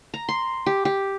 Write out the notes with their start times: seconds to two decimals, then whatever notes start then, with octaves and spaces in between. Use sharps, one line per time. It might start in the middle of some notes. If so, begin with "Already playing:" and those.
0.14 A#5
0.29 C6
0.66 G4
0.85 G4